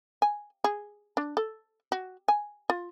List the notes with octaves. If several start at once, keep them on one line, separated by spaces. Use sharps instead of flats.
G#5
G#4
D4
A4
F#4
G#5
F4